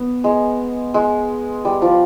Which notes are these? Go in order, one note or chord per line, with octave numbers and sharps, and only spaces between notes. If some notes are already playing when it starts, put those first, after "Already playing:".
Already playing: B3
G#3
G#3
G3
F3